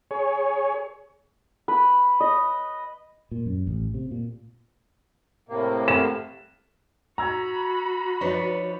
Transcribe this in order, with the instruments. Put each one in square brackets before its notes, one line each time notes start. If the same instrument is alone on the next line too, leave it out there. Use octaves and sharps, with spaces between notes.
[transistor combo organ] G#4 C#5
[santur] B4
D#5
[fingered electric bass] A#2
F#2
A1
C3
A#2
[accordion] A2 C3 A#3
[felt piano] E7
[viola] F#4 B5 [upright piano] A#5 E6 G#6
[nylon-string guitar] F3 D#4 [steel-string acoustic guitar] D4 B4 C#5